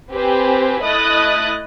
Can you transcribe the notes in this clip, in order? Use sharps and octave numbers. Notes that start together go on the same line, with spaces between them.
C4 G4 B4 C5 G#5
A3 E4 D#5 D#6 F#6 A6